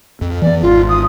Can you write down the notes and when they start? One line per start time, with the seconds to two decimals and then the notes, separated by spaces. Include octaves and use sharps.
0.21 F2
0.42 E3 B3 D5
0.62 G#1 F4
0.89 D#6